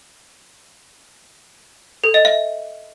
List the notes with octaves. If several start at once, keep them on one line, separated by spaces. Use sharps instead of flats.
A4
D#5
E5